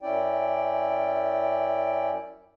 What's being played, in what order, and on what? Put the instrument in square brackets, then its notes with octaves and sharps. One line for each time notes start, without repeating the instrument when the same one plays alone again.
[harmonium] F#2 C#4 E4 D5 G5